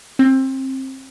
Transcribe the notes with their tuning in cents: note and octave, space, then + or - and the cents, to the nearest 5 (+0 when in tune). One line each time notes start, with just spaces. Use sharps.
C4 +25